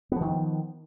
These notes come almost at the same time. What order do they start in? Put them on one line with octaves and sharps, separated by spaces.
B3 F3 D#3